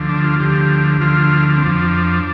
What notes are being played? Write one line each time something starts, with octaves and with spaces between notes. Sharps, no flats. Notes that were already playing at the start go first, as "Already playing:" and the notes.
Already playing: D2 D3 F3
D4
F4
D2 D3 F3 G4
D2 D3 F3 F4
C4
F2 F3 D4